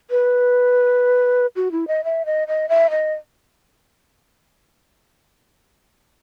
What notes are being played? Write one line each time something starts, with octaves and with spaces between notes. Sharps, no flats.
B4
F#4
E4
D#5
E5
D#5
D#5
E5
D#5